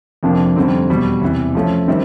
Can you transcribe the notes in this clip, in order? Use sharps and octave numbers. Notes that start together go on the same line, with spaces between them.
F2 C3 F3 A#3 D4
F2 D3 G3 C4 D#4
E2 B2 G3
E2 C3 E3
F3 A3 C#4
D#3 G3 C4 E4